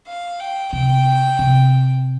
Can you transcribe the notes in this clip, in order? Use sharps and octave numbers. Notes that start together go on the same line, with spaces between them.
F5
G5
C3 G5
C3